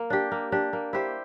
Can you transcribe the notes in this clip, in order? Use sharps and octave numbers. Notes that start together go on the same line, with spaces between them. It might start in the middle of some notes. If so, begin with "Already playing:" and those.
Already playing: A#3
D4 G4
A#3
D4 G4
A#3
E4 G4 C5